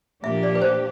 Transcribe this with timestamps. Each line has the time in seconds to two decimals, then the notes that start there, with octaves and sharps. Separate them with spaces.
0.24 A#2 F3 A#3 D4 G4 E5
0.43 D5
0.55 B4
0.62 C5